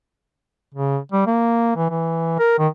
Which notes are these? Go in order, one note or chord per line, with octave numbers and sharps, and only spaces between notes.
C#3
G3
A#3
E3
E3
A#4
D#3